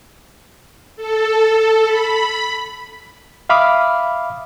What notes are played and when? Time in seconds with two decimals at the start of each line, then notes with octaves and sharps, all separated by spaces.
0.96 A4
1.85 B5
3.49 E5 F5 B5 D6 D#6 F6